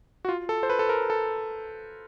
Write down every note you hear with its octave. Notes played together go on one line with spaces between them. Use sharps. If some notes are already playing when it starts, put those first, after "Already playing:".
F#4
F4
A4
C5
B4
A4
A#4
A4